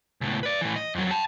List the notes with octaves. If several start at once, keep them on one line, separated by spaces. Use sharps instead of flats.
C#2 A2
B4 D5
A2 E3
D#5
F2 F#3
G5 A5